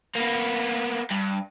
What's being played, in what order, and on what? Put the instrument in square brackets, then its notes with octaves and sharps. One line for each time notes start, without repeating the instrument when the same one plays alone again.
[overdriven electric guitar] A#3 B3
G2